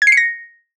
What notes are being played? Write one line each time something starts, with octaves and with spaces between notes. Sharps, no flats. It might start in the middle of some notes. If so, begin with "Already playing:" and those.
G#6
C7
C#7
A#6